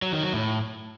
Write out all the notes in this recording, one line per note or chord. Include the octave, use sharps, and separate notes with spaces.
F#3
D#3
F#3
A2